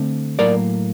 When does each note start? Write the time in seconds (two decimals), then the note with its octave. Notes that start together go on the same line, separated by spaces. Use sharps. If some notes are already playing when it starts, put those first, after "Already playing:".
Already playing: D3 A3 C4
0.39 A2 F#3 A#3 A#4 D5